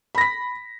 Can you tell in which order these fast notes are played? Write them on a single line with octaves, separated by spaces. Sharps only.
B5 A#6 B6